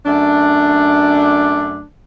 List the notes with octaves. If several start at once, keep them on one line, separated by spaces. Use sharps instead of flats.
F#2 A3 D4